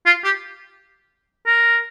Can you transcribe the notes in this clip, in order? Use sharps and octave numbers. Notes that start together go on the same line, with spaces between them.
F4
G4
A#4